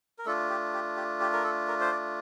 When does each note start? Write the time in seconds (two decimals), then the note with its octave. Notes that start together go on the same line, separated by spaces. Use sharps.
0.19 A#4
0.26 A3 D4 F4 A4
0.50 G4
0.73 G4
0.97 G4
1.20 G4
1.33 A#4
1.44 A4
1.68 A#4
1.80 C5
1.91 D5